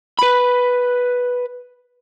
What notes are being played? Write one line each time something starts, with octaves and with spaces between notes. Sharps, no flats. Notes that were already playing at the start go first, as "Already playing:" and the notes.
B4 B5